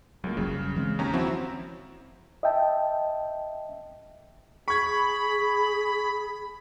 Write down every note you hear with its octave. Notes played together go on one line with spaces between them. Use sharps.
C#2 F#3 A#3
F#1 C#3 F#3 G3
E3 G#3 C4
D#2 C#4 A#5
F3 C4 E4 F#4
D#5 E5 G5 A5
G#4 B5 C#6 G#6